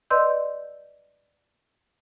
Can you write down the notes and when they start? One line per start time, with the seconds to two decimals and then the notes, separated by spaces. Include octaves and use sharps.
0.10 B4 D5 D#5 C6 E6 G6